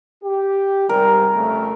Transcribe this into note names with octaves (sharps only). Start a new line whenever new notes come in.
G4
G#2 C3 G3 A#4
F2 C#3 A3